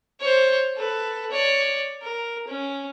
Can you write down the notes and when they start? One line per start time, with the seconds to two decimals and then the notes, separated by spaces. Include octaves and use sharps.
0.20 C5 C#5
0.76 A4 B4
1.31 C#5 D5
2.02 A#4
2.48 C#4